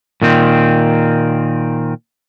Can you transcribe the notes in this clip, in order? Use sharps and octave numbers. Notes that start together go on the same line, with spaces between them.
A#2 D#3 C4